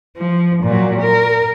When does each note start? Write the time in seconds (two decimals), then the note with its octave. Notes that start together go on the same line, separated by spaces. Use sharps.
0.17 F3
0.64 A#2 F#3
1.01 A#4